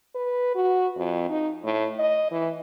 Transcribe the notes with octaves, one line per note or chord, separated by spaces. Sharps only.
B4
F#4
F2
D#4
A2
D#5
E3